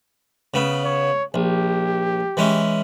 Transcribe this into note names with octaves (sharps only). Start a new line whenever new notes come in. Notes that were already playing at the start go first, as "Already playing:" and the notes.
C#3 B3
C#5
A#1 G4
E3 G#3 C#4